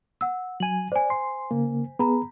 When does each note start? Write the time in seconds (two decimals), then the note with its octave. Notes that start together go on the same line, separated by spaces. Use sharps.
0.21 F#5 E6
0.60 F#3 G#5 D#7 F#7
0.92 C5 D5 G#5
1.10 C6
1.51 C#3 A#3
1.99 B3 G#4 A#5 B5